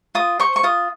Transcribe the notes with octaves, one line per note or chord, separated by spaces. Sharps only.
F4 D#6
C5 C#6
C#6
F4 D#6